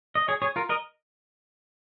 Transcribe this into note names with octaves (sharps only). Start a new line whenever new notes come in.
D#5
G#4 C#5
G#4 C#5
F4 A#4
A#4 D#5